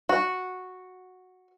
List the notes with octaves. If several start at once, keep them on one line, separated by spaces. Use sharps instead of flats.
F#4